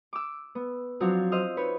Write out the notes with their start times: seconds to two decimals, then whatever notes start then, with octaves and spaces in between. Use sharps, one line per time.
0.13 D6 E6
0.55 B3
1.00 F3 F#3 C4 D4
1.32 C5 D#5 E6 F6
1.57 D#4 B4 C#5